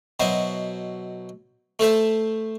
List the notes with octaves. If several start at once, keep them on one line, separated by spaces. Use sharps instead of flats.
B2 F#3 E4 C5 D#5
A3 A4 C5 E5